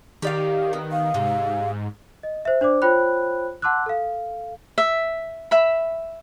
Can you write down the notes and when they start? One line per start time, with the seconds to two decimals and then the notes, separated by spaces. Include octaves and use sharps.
0.22 D#3 G4 D5 F5
0.73 B3
0.92 F5
1.14 G#2 C3
2.23 D#5
2.45 C5 E5
2.61 D4 C5 D5 D6
2.82 F4 C5 C#5 G5 B5 F#6
3.62 F#5 A5 C6 D6 E6 F#6
3.86 A4 F5
4.78 E5
5.51 E5 B5